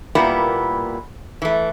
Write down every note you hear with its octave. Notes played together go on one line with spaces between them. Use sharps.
A#2 G3 A#3 B3 E4
E3 A3